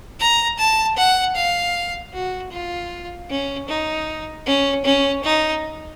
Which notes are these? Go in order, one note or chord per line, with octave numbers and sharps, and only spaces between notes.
A#5
A5
F#5
F5
F#4
F4
C#4
D#4
C#4
C#4
D#4